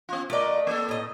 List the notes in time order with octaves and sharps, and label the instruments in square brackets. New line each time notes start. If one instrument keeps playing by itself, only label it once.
[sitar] B3 F4
[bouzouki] A3 D5 [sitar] F4 A#4 D#5
[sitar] A#3 A4
[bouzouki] A2 D#5